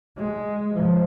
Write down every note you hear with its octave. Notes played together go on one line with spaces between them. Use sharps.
G#3
F3